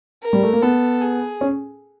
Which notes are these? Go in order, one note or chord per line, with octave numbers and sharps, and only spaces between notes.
A#4
G3
A3
A#3
B3 A4
G#4
C#4